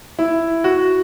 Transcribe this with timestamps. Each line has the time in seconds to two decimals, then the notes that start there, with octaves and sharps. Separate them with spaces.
0.19 E4
0.64 F#4